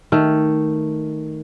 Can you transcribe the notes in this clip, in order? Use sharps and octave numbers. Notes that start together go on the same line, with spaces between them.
D#3 A3